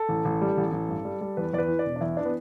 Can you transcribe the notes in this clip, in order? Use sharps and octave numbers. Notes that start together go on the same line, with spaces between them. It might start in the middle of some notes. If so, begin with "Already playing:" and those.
Already playing: A4
A1
A1
G3
A1
A1
G2
G3
G3
E2 B4
E2 B4 D5
E3
D5
E1
D4
E2 E4
E3 D4
B3